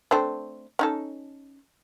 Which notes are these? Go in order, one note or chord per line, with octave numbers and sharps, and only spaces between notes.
A3 C4 D4
C#4 D#4 A4